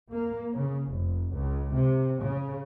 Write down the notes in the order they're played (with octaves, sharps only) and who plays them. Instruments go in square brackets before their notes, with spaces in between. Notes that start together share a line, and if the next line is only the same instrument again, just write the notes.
[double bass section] A#3
C#3
F1
C#2
C3
C#3